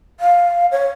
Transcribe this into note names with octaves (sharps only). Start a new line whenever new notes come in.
F5
C#5